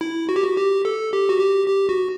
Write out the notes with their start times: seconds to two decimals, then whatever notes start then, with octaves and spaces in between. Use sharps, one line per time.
0.01 E4
0.29 F#4
0.36 G4
0.44 F#4
0.56 G4
0.85 A4
1.13 G4
1.29 F#4
1.40 G4
1.68 G4
1.89 F#4